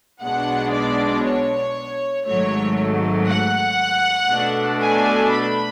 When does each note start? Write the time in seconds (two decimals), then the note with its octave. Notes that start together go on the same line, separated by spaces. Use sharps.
0.22 B1 B2 G#3 B3 D4 F#5
0.73 D5
1.24 C#5
2.26 G#1 G#2 F#3 A3 C#5
3.28 F#5
4.30 B2 A3 D4
4.82 G#5
5.33 B5